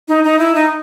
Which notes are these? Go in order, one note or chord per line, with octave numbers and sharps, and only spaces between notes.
D#4
D#4
E4
D#4